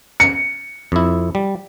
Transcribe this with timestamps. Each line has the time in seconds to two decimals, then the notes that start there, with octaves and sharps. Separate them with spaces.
0.20 C#7
0.92 F2 E4
1.35 G3